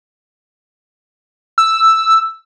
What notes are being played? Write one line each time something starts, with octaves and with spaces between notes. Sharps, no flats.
E6